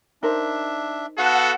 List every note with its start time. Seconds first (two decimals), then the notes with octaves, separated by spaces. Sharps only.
0.23 D4 D#4 A#4 C5 E5
1.18 B3 F#4 A4 F5 F#5